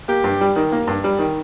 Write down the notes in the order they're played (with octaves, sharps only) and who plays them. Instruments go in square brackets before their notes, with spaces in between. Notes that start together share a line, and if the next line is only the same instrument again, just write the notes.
[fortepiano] A#3 [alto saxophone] G4
[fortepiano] G2
G3
D#3
A#3
G2
G3
D#3